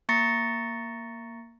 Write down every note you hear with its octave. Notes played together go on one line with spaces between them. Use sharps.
A#3 A#5 C#6 A6 A#6 C#7